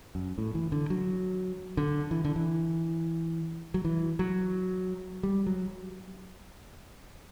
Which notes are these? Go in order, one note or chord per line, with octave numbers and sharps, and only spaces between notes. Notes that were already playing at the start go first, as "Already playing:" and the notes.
F#2
A2
E3
D3
F#3
D3
E3
D3
E3
F#3
E3
F#3
G3
F#3